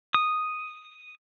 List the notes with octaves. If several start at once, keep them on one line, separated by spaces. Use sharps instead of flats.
D#6